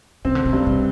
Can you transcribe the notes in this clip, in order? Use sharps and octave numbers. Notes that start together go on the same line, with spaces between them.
C3 C4
D3
C3
G2
C3